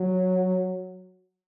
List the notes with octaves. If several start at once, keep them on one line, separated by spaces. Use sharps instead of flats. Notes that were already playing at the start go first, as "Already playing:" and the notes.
Already playing: F#3